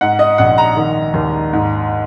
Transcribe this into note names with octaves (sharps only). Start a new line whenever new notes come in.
G#2 F#5
D#5
A#1 F#5
A#5
D#3
D#2
G#2